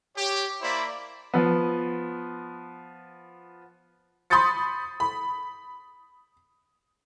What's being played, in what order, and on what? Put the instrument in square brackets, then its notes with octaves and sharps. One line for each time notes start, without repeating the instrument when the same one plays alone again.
[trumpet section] G4 C#5
A#3 E4 C5 D5 B5
[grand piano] F3 B3
[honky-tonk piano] B5 C6 D#6 G6 A6 C#7
B5